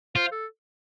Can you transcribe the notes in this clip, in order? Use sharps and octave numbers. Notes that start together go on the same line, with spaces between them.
F4 C5
A4